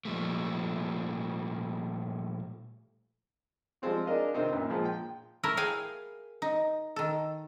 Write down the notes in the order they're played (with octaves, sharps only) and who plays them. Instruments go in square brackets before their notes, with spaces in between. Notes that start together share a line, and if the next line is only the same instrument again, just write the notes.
[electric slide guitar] A#2 F3 G3 A3
[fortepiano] F3 G3 G#3 C4 F4
D4 G#4 A#4 D#5 F5
G2 C3 D#3 C4 D#4
F#2 A#2
A#2 F3 G#3
G5
[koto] A3 E4 A#4
G#4 F5 G5 G#5
D#4
D#3 A4